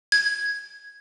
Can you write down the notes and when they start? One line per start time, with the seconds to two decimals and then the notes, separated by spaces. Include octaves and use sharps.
0.12 G#6